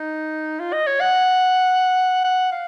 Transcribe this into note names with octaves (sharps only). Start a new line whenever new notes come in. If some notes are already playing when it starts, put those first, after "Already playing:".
Already playing: D#4
F4
D#5
C#5
F#5
F#5
F5